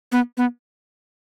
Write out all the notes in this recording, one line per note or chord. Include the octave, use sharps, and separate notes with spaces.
B3
B3